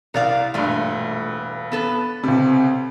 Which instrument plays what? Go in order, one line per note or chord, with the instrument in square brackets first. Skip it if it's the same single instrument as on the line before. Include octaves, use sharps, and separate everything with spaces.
[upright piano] C2 [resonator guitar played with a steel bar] A#4 D5 F5
[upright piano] E1 G2 [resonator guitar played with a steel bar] A#2 A3
[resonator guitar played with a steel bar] B3 A4 B4
[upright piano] C#2 C3